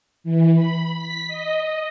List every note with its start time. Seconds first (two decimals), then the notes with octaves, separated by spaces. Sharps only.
0.24 E3
0.54 B5
0.93 B6
1.28 D#5